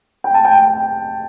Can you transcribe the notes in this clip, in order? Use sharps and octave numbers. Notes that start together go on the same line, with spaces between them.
G5
A5
G5